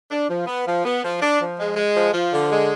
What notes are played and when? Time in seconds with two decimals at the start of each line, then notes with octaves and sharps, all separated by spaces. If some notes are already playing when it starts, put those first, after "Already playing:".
0.11 D4
0.29 F3
0.47 B3
0.66 F3
0.85 B3
1.03 F3
1.21 D4
1.40 F3
1.58 G#3
1.76 G#3
1.95 F3
2.13 F3
2.32 D3
2.51 G#3